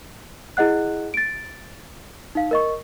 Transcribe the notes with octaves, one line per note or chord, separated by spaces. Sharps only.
E4 G#4 D#5 F#5 F#6
A6 D7
D#4 F5
A#4 D#5 C#6